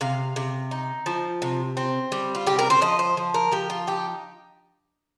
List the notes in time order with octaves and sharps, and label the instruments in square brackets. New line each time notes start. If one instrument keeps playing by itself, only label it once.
[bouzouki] C3 F5
C3
D#4
F3
C3
C4
G3
F4
C3 G4
A#4
C5
F3 D#5
C5
F3
A#4
F3 G4
F4
D#4 G4